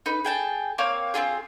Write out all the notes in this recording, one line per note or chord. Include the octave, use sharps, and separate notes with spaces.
D#4 B4
G#4 G5 A5
A#3 C4 C#5 F5
C4 E4 F4 G#4